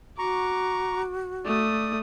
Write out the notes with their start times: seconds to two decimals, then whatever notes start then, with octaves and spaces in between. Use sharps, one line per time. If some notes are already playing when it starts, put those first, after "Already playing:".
0.18 F#4 A#5 C#6 D6
1.45 A3 D5 D#6